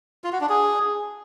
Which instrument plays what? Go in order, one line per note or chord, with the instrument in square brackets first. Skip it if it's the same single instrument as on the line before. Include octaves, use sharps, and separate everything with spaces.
[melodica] F4
F#4
D4
G#4